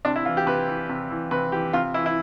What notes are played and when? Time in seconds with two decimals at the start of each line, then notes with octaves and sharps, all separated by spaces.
0.05 C3 D4
0.16 E4
0.25 E3 F4
0.37 G4
0.46 C3 B4
0.68 E3
0.89 C3
1.10 E3
1.31 C3 B4
1.52 E3 G4
1.73 C3 F4
1.94 E3 E4
2.06 E4